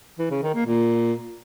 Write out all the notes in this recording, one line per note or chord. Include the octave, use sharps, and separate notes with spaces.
E3
C#3
D#3
A#3
A#2